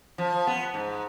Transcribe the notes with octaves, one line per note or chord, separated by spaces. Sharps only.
F3
B3
G#2